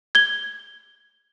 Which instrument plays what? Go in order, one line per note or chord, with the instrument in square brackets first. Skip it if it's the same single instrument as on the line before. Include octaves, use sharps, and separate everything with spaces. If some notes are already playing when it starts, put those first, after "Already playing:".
[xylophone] G#6 G7